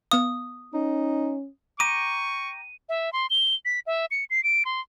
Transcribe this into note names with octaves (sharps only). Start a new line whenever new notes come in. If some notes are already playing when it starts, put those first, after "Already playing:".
B3 F5 D#6
C#4 D#4
G5 A#5 C#6 D6 D#7
E5
C6
G7
B6
E5
C#7
C7
D7
C6